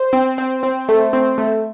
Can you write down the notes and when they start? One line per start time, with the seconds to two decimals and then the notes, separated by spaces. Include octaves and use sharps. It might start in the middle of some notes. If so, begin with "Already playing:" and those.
Already playing: C5
0.13 C4
0.38 C4
0.63 C4
0.89 A3
1.13 C4
1.38 A3